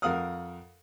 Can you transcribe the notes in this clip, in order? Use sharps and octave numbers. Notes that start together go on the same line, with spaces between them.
F2 A#4 F5 F#5 D#6 F6